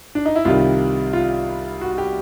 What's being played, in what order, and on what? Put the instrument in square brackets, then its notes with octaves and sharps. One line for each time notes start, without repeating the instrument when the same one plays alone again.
[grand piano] D4
D#4
E4
C2 C3 D#3 G3 F4
F4
F#4
G4